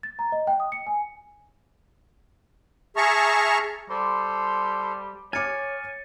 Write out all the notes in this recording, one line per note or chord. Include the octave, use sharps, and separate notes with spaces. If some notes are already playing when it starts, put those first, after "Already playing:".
A6
A#5
D#5
G5
D#6
C#7
G#5
G#4 E5 A5 A#5 C#6 F6
G3 A4 C5 C6
C#5 G#5 D6 F6 A6 C#7